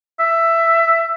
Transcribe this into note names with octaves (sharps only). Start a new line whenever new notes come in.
E5